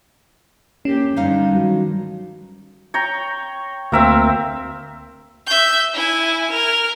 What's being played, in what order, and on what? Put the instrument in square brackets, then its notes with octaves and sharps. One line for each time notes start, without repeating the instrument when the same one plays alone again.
[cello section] A#3 G4 [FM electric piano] C#4
[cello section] G2 D3 G#3 [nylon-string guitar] D#4 F5
[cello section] D#3 [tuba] F#3
[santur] C#5 G5 A#5
[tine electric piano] D2 A#3 A#4 [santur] C4 E5 F5
[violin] E5 G6
E4 G#5
A#4